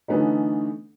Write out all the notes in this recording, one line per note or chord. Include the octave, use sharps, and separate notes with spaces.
D3 E3 A3 B3 C#4 D#4